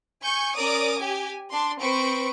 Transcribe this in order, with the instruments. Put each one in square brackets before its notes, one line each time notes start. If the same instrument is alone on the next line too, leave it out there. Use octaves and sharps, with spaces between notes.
[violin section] G#5 C#6 G6
C#4 A#4 D5 D6 D#6
G4 G#5
D4 C6
C4 B4 C5 C#6 D7